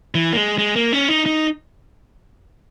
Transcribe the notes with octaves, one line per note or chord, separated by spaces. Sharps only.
E3
A#3
G#3
G#3
A#3
C#4
D#4
D#4